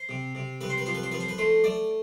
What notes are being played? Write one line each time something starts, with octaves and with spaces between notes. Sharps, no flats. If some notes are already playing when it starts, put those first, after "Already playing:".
Already playing: C5
C3
C3
C3 B4
C5
B4
F3 C5
B4
C5
F3 B4
C5
B4
A3 C5
A3 D5